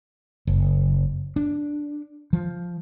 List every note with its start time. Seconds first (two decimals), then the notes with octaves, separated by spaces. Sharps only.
0.47 F#1
1.36 D4
2.33 F3